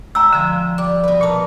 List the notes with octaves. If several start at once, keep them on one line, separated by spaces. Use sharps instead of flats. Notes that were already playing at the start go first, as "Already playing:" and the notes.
F4 E5 G5 A#5 E6
D3 F3 G5 G#5
G3 D5 D6
B2 B4
A#2 A#4 B4 A5